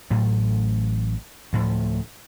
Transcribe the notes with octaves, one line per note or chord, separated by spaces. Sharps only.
A1 A2 F#3 A3
D2 A2 F3